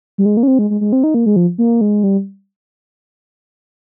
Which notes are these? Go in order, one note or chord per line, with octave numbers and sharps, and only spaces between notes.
G3
G#3
A#3
C#4
C4
G#3
G#3
G#3
C4
D#4
A#3
G#3
F3
A#3
G#3
G3